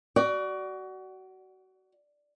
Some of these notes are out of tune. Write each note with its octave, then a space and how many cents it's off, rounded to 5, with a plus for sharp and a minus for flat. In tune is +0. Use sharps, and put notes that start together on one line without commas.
F#4 +25 D5 +0